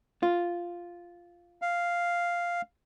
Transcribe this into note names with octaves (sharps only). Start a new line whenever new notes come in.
F4
F5